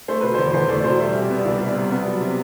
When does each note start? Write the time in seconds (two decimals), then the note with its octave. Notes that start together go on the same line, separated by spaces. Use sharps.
0.08 A3 C5
0.21 B2 B4
0.34 E2 C5
0.53 E2 C5
0.68 A3 D5
0.79 D5
0.84 B2 C5
1.00 G3 E5
1.11 C3 E5
1.22 D5
1.29 B3 E5
1.45 C2 D5
1.60 G3
1.68 D5
1.76 C3
1.91 B3
2.06 F#3
2.21 C3